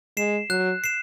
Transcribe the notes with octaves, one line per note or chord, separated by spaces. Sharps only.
G#3 C7 E7
F#3 F#6
C7 E7